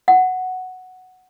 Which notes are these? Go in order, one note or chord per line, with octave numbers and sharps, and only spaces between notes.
F#5